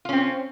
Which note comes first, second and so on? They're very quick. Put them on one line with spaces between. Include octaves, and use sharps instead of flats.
F4 C#4 C4